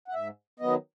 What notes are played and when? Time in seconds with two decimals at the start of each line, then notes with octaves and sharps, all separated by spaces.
0.08 F#5
0.14 G#2 E5
0.60 D#3 F#3 B3 D#5